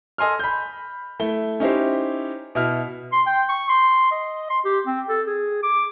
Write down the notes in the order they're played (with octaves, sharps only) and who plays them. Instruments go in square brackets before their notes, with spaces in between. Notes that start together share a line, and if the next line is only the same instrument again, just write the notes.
[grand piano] A4 D#5 G#5 C6 F6
B5 G6
A3 E4 G7
C#4 D#4 E4 G4 C5
B2 E4 F6
[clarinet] C6
G5
C#6
C6
D#5
C6
G4
C4
A4
G#4
D6